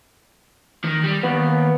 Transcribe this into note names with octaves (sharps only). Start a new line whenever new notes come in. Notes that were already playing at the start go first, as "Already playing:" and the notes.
D#3
G3
D#2 B3